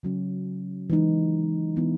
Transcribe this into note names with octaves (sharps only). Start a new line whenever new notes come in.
C#3 F#3 C#4
E3 G#3 D#4
E3 B3 E4